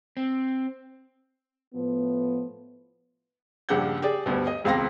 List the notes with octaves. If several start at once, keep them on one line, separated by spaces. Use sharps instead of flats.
C4
A2 F3 B3
A#1 G2 C#3 D4 F#5 G6
G4 G#4 D5
D2 G2 B2
D#5
E1 C#2 C4 F5 C6 A#6